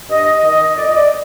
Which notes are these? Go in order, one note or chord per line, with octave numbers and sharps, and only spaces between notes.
G2 D#5
D#3 D#5
F2 D5
D#5
D5